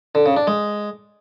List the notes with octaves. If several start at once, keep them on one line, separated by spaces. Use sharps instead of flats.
D3
C#3
D4
G#3